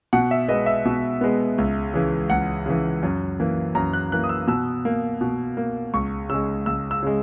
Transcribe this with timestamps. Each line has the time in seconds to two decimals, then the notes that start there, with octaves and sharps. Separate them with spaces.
0.13 B2 F#5
0.31 E5
0.48 G#3 B3 D#5
0.66 E5
0.85 B2
1.21 G#3 B3
1.58 C#2
1.94 C#3 E3
2.30 C#2 F#5
2.66 C#3 E3
3.03 F#2
3.40 E3 A#3
3.75 F#2 A#5
3.93 F#6
4.12 E3 A#3 F#6
4.24 D#6
4.29 E6
4.47 B2 E6
4.85 A#3
5.21 B2
5.57 A#3
5.94 C#2 C#6
6.29 C#3 G#3 E6
6.66 C#2 E6
6.91 E6
7.03 C#3 G#3